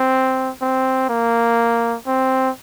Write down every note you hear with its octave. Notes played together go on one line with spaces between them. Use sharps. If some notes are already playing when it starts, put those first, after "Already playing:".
Already playing: C4
C4
A#3
C4